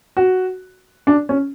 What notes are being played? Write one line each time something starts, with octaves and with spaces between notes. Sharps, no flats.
F#4
D4
C#4